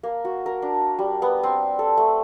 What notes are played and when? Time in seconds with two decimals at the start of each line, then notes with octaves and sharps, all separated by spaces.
0.03 A#3
0.25 F#4
0.46 A#4
0.62 D4
0.98 G3
1.22 B3
1.43 C4
1.79 A4
1.97 A3